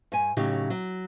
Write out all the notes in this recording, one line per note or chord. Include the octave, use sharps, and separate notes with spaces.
G2 G#5
A2 C#3 F#3 D#4 G4
F#3